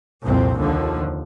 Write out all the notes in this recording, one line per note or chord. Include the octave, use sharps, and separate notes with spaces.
C2 F2 A#2 C4
D#2 D3 F3